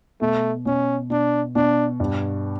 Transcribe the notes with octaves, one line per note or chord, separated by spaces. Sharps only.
B2 A3
B2 C#4
B2 D4
B2 D4
G2